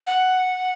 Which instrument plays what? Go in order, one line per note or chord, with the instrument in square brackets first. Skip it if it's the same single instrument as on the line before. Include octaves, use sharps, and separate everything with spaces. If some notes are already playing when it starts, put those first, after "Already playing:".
[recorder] F#5